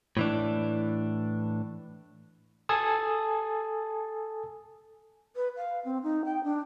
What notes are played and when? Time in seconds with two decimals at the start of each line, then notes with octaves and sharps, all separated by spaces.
0.17 A2 E3 D4
2.69 A4 G#5 A5 D#6
5.36 B4
5.57 F5
5.85 C4
6.03 D#4
6.25 G5
6.44 D4